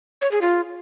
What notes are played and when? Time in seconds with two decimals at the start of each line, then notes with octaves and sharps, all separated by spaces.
0.21 C#5
0.31 G#4
0.41 F4